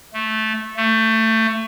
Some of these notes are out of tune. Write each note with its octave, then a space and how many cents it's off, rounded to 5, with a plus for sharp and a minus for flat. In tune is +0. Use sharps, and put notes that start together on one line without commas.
A3 -10
A3 +20